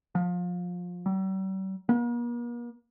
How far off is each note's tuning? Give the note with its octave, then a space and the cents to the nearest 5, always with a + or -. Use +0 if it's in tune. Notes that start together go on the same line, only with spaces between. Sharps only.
F3 +25
G3 -45
A#3 +45